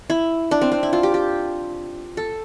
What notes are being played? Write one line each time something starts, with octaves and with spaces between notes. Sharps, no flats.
E4
D4
C4
C4
E4
F4
G4
G4
A4